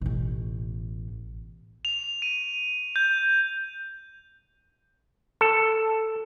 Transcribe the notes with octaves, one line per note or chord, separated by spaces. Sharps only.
A1 B2
F7
D#7
G6
A4